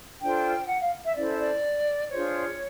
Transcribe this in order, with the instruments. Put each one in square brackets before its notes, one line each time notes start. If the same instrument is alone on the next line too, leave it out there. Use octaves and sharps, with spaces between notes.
[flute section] D4 F4 A4 C5 G5
F#5
F5
E5
C#4 E4 A4 C5 D5
D5
D4 F4 G#4 C5 C#5